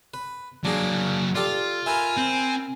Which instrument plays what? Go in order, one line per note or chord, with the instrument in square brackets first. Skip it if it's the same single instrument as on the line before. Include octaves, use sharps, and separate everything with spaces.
[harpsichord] B4
[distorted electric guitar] F#3 A#3 [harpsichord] D4 G#4
[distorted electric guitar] F4 [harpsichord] G4 A4 D5
[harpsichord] A#4 B4 E5 [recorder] G#5
[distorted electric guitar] C4